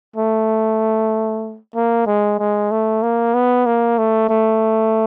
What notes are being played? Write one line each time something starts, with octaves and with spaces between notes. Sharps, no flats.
A3
A#3
G#3
G#3
A3
A#3
B3
A#3
A3
A3